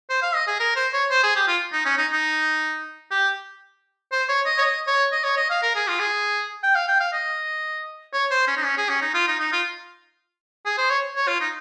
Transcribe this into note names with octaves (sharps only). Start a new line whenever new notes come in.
C5
F5
D#5
G#4
A#4
C5
C#5
C5
G#4
G4
F4
D#4
C#4
D#4
D#4
G4
C5
C#5
D#5
C#5
D#5
C#5
D#5
C#5
D#5
F5
A#4
G#4
F4
G#4
G5
F5
G5
F5
D#5
C#5
C5
C#4
D#4
C#4
G#4
C#4
D#4
F4
D#4
D#4
F4
G#4
C5
C#5
C#5
F4
D#4